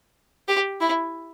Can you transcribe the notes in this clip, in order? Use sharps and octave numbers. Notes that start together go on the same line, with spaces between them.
G4
E4